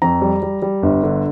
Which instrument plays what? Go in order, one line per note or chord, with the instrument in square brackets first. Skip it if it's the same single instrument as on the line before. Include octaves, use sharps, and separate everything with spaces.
[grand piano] F2 A#5
G3
G3
G3
G1
D3